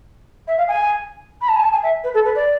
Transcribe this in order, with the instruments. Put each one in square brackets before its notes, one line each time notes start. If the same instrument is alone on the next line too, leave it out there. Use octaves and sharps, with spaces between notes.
[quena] E5
F5
G#5
B5
A5
G#5
A5
G#5
E5
B4
A4
B4
D5